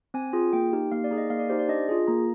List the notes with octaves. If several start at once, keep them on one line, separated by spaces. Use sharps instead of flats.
C4 G#5
F4 G#4
A#3 G5
D#4 G4
A#3 F5
D5
D#4 G#4
D#5
A#3 F5
D5
D#4 G4 C5
D5
D4 D#5
F4 G#4
A#3 A#5